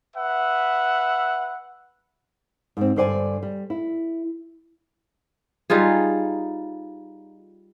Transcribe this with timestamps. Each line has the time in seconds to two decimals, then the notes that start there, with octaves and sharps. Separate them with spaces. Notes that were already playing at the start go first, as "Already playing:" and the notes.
0.16 B4 E5 F#5
2.77 G#2 C4
2.96 G2 D3 C5 D5 G5 G#5
3.43 G3
3.70 E4
5.70 G3 D#4 F4 G#4